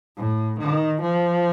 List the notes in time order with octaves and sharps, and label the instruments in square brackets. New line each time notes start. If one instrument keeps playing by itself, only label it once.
[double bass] A2
D#3
F3